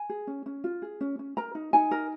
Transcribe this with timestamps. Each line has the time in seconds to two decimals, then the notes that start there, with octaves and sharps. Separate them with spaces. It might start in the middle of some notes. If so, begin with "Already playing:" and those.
Already playing: G#5
0.09 G#4
0.27 C#4
0.46 C#4
0.64 F4
0.82 G#4
1.01 C#4
1.19 C#4
1.37 A#4 A#5
1.55 D#4
1.73 D#4 G#5
1.91 A#4